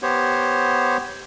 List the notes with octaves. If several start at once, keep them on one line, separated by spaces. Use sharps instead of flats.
B3 G4 C5 C#5